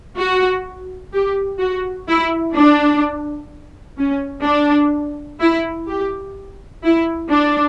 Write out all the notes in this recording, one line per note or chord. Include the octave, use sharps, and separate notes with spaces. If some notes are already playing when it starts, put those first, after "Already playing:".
F#4
G4
F#4
E4
D4
C#4
D4
E4
G4
E4
D4